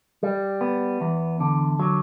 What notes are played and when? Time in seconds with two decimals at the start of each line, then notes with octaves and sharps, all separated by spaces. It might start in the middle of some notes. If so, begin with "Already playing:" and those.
0.23 G3
0.61 B3
1.01 E2
1.40 D3
1.80 F#3